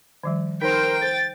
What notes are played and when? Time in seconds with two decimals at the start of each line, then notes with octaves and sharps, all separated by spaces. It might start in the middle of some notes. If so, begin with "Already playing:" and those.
0.24 D#3 F3 G3
0.62 D#4 A#4 C5 G5
1.01 A4 C5 A6